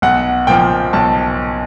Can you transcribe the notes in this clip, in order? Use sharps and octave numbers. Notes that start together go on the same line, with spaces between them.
B1 F#5
A#2 F3 G5
B1 A5